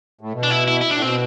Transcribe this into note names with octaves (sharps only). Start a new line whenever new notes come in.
A2
B2
D4
E4
E4
E4
A2 D4
B2 C4